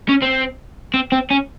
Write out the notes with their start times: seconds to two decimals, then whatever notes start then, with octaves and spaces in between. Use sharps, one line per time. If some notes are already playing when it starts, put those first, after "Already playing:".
0.09 C#4
0.22 C4
0.94 C4
1.12 C4
1.30 C#4